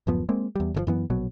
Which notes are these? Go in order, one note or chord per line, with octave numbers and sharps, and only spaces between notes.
D1 F#2 F3 B3
G#3 A#3 C4
E2 G3
G1 D3 F3
F#2 E3 B3
A#1 B2 F#3